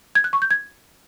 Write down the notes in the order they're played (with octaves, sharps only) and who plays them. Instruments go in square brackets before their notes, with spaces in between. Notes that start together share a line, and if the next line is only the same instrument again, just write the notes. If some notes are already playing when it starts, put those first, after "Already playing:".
[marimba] G#6
F#6
C#6
G6
G#6